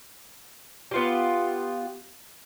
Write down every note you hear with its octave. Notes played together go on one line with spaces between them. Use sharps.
B3 F4 G4